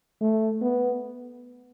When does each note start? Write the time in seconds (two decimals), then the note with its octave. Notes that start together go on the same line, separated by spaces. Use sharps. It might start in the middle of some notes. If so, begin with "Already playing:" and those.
0.21 A3
0.62 B3